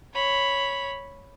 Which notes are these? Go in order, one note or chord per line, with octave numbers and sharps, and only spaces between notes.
C#5 B5